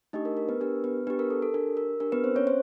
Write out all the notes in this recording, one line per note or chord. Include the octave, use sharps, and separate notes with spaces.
A3 D4 D#4 G4 D#5
A#4
A#4
B3 B4
D4 G4 A#4
B3 B4
B3 D4 G4 B4
A#4
A4
A4
D4 G4 A#4
A#4
D4 G4 A#4
B3 B4
C4 C5
C#4 C#5
C5